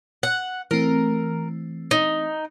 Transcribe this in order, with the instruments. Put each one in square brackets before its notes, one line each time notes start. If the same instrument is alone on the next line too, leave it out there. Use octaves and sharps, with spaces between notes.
[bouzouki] F#5
[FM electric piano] E3 A3 C4 [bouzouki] A#4
[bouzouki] D#4